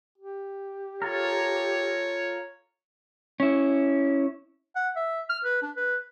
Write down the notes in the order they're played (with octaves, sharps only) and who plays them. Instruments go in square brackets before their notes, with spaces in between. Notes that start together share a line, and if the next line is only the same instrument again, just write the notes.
[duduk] G4
[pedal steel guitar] F4 A4 A#4 [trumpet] C#5
[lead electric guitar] C#4 E4
[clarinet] F#5
E5
F6
B4
D4
B4